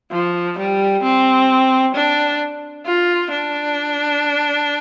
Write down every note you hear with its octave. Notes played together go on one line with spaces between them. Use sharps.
F3
G3
C4
D4
F4
D4